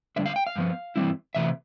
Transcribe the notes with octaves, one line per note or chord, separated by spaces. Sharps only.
D3 G3 D4 E5
F5
G5
F5
G2 F3 B3
G2 E3 G3 C4 E4
C3 E3 A3 E5